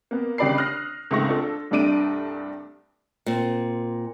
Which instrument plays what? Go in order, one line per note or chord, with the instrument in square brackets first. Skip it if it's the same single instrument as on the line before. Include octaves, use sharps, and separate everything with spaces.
[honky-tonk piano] A#3 B3
G1 C#3 G4 D5 B5 C7
D#6 F6 F#6 A#6
C#2 G#2 A3 C4 C#6 A#6
D4 F4 A4
C2 G2 A3 D4 D7 D#7
[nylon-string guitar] A#2 C4